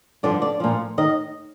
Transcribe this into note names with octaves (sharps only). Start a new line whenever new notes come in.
G2 D3 F3 D5
D5
A#2 F3
D#3 D#5